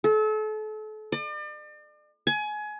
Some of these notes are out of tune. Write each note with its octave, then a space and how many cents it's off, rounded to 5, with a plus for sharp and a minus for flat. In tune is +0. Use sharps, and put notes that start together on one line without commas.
A4 -35
D5 +40
G#5 +25